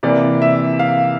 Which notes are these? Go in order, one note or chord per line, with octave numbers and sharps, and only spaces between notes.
C3 E3 A#3 D5
E5
F5